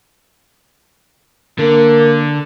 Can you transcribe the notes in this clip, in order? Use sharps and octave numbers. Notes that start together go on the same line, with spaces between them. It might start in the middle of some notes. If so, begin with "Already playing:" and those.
D3 A#3